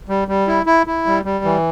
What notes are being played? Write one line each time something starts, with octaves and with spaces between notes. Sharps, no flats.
G3
G3
E4
E4
E4
G3
G3
E3